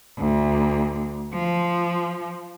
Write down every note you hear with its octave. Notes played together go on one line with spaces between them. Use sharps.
D2
F3